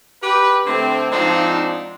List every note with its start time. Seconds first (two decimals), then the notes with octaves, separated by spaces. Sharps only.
0.23 G4 B4
0.66 D3 A3 C4
1.11 G#2 F3 C4 D4 D#4